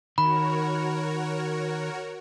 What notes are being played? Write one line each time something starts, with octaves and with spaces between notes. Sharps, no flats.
D#3 F#4 A#4 C#5 B5